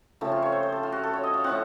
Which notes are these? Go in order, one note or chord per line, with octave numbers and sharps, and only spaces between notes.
C#3 F3 A3 C4 A4
F4
C#5
C5
C5
A4
F4
F#4
A4
C#5
D#5
F5
A2 F3 C4 F#5